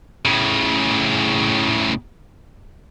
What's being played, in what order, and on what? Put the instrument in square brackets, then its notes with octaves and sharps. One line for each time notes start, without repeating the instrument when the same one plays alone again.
[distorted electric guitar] A2 C#3